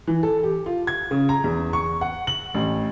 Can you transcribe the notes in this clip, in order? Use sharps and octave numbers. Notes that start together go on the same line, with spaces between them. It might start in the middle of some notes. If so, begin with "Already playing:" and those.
E3
A4
G4
F4
G#6
C#3
A#5
E2
C#6
F#5
F#7
A1